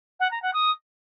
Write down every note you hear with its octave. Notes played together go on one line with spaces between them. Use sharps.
F#5
A#5
F#5
D#6